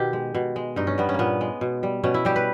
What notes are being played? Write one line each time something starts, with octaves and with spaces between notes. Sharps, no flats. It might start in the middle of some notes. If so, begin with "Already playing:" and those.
Already playing: B2 D#3 G4
G#3
B2
G#3
G2 D#4
C#4
G3 B3
C#4
A#2 A#3 B3
G#3
B2
G3
B2 C#4
E4
G3 G4
B4